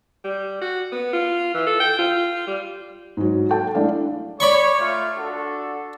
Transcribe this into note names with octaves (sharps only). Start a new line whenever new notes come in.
G3
F#4
B3
F4
E3
A4
G5
F4
G3
G#2 F#3
A4 G5 A5
G#3 A3 D4 E4 D5 F5
C#5 D5 B5 C#6
A3 F4 F5
D4 F#4 A4